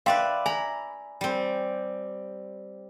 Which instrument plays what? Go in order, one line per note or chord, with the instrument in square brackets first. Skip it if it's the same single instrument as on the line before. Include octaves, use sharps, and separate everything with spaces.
[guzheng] B4 D5 E5 [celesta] F5 G5 C6
[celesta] G#5 [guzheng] A#5 B5
[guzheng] G3 C4